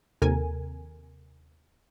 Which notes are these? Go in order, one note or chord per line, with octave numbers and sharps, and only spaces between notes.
D#2 C3 A4 A#4 G#5